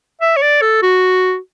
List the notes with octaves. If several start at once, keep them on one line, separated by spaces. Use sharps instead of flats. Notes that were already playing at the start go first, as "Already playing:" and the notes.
E5
C#5
D5
A4
F#4